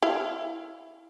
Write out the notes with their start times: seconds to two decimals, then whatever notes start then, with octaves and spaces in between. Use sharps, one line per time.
0.02 E4 F5